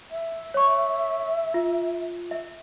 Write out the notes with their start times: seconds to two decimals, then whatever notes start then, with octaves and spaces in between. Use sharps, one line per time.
0.11 E5
0.54 C#5 C#6
1.54 F4
2.31 E5